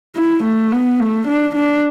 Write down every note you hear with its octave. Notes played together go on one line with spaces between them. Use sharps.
E4
A3
B3
A3
D4
D4